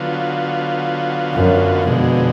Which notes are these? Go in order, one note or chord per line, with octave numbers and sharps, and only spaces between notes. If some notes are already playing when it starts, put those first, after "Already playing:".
Already playing: D3 F#3 B3 F4
F#2
F2 B2 D3 G#3